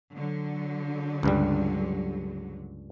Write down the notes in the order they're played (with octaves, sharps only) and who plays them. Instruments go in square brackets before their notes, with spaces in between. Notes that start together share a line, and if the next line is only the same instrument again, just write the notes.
[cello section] D3 F#3
[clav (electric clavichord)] C#2 G2 G3